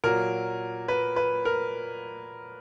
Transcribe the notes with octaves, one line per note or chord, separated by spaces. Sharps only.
A#2 F#3 A#4
B4
B4
A#4